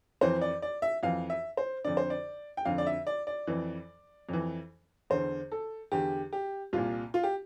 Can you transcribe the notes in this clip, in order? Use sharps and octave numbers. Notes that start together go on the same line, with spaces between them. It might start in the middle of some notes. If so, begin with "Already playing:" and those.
F2 E3 C5
D5
D5
E5
F2 E3 F5
E5
C5
F2 D3 D5
C5
D5
G5
F2 D3 F5
D5
E5
D5
D5
F2 E3
F2 E3
E2 D3 C5
A4
E2 D3 G4
G4
C2 A#2 F4
F4
G4